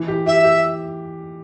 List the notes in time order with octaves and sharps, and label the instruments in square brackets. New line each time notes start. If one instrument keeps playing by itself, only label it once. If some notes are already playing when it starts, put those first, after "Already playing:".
Already playing: [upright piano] E3
G4
[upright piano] G4 [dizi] E5
[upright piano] G4